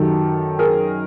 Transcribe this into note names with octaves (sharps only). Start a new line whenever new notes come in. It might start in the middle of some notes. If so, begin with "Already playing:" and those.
Already playing: F#2 D#3 F#3 G4 A4
G#4 A#4